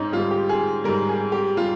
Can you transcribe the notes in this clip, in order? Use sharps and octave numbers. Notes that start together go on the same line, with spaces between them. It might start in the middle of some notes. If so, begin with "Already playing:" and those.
Already playing: G#2 C#4 D#4
G#2 G3 F4
G4
G#4
G#2 G3 A#4
G#4
G4
G3 F4